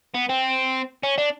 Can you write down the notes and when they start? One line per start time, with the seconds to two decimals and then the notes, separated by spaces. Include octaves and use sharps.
0.15 B3
0.29 C4
1.03 C#4
1.18 D4